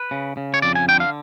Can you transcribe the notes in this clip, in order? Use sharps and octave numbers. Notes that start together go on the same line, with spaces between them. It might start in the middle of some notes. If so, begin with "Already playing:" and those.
Already playing: B4
C#3
C#3
C#5
F2 D5
G#5
D3 G5
F5